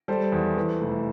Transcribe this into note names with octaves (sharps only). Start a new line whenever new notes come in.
G3 A4 C5
E2
E3
F1